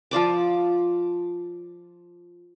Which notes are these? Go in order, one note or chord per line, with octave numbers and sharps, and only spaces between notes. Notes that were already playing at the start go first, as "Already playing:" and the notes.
F3 F4 D5 D6